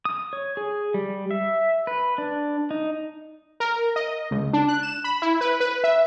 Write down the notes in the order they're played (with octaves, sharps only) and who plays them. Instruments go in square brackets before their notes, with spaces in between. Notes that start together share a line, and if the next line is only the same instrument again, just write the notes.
[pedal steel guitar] D#6
C#5
G#4
G3
E5
B4
D4
D#4
[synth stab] A#4
D#5
C#2
D4
F#6
E7
B5
E4
B4
B4
E5